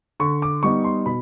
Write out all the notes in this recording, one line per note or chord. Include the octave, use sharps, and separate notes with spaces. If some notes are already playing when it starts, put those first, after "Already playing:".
D3 C#6
D6
G3 B3 D#4 C#6
C6
B2 B5